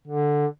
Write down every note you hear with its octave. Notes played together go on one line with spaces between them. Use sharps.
D3